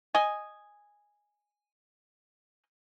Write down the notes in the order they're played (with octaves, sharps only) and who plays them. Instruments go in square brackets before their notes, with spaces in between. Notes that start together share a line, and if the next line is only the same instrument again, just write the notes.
[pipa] D#5 G#5